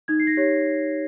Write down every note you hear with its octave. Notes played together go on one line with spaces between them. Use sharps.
D#4 G#6
C7
A#6
G4 C#5